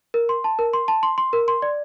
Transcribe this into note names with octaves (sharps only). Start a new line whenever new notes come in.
A#4
C6
A5
A#4
C6
A5
C6
C6
A#4
C6
D5